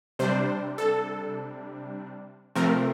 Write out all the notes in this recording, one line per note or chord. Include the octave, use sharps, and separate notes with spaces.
C3 G3 D4 C5
A4
C3 F3 A3 C4 A#4